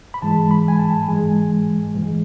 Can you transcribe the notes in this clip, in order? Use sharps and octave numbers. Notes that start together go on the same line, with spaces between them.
B5
G#2 E3 G#3 A5
B5
G#5
A5
G#2 E3 G#3 G#5
G#2 E3 G#3